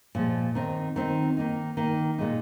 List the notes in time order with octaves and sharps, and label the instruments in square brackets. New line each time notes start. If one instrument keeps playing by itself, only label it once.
[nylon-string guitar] A#2 F3 G#3
D#3 C4 D#4
D#3 C4 D#4
D#3 A#3 D#4
D#3 A#3 D#4
A#2 G#3 D#4